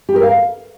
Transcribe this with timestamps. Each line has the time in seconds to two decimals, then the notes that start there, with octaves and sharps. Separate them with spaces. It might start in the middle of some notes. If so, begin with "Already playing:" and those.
0.09 G4
0.16 A#4
0.23 F5